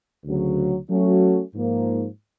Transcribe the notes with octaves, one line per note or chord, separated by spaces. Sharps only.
D2 C#3 F#3
F#3 A3 C#4 F#4
G#2 F3 A#3